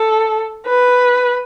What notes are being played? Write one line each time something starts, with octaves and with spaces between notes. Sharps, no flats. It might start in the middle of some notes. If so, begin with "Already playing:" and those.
Already playing: A4
B4